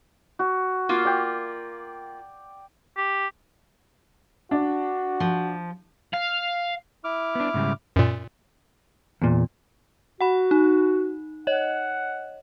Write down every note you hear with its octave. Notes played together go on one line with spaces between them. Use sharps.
F#4
A#3 F4
D5 G5
G4
D4 F#4
F3
F5
E4 D6 F6
B3 D4
G#2 C#3 G3
F#2 A#2
E2 A#2
F#4 F#5 B5
D#4
C#5 D#5 F#5